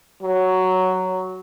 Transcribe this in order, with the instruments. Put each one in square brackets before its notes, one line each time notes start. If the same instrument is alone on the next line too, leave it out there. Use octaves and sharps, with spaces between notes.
[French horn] F#3